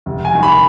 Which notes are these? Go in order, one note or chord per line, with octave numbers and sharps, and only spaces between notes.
F1
G#5
D#2 D#3
B5